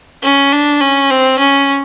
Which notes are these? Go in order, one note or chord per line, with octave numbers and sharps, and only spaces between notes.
C#4
D4
C#4
C4
C#4